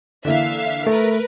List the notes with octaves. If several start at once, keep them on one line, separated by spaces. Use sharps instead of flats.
D3 E3 A#3 E5 F5
A3 A#4 B4